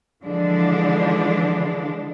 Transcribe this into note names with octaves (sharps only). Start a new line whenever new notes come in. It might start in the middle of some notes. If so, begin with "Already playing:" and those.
D3 E3 F3 G#3 D4